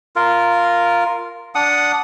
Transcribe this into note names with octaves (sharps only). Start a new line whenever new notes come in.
F4 A#4
D4 F#5 D#6